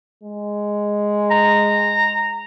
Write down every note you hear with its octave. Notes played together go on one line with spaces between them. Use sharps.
G#3
A#5